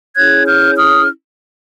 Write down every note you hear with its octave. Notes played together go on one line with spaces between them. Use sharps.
C#4 E4 G#4 C#5 F#6 G#6
F6 G6
D#6 F6